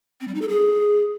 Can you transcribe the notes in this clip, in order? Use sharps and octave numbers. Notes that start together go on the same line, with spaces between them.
C4
G3
D#4
A4
G#4